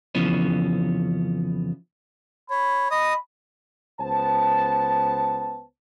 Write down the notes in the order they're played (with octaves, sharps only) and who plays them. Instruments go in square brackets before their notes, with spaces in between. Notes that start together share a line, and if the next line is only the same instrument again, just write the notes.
[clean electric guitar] F2 C#3 E3 F3 B3 C#4
[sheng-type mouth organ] C#5 [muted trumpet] B5
[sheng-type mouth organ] D#5 D#6 [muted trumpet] B5
[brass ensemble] C#2 B3 C5 A5